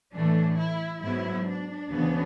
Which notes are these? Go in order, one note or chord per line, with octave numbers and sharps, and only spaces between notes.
A2 E3 A3 D4
E4
G#2 F#3 B3 E4
D4
D2 C#3 E3 B3